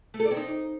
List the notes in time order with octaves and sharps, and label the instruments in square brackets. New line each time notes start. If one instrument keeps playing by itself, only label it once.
[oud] A3
A4
D5
C4
D#4